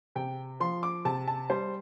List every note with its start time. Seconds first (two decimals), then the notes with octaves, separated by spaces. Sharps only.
0.15 C3 G5
0.60 F3 C6
0.83 D6
1.05 C3 A5
1.28 A5
1.50 G3 C5